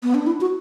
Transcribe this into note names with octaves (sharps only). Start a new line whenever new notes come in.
B3
D4
E4
F#4